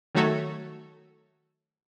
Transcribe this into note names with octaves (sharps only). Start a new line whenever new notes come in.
D#3 F#3 A3 F#4 A4 C#5